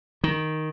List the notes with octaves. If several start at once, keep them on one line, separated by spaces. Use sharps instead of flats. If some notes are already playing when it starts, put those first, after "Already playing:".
D#3